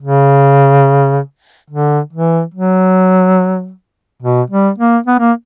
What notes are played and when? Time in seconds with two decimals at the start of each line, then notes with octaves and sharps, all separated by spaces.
0.02 C#3
1.70 D3
2.13 E3
2.54 F#3
4.22 B2
4.50 G3
4.78 A#3
5.06 B3
5.19 A#3